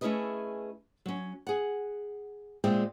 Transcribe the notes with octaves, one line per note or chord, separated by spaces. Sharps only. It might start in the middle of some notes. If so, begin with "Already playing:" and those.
A3 C#4 E4 G#4 B4 D#5
F#3 C#4
G#4 F#5
A#2 G#3 C4 D5 E5 G5